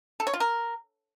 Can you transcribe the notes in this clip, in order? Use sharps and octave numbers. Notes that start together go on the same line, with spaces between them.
A4
C#5
F4
A#4